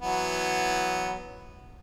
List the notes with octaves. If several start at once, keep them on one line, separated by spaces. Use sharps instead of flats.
E3 F#3 B3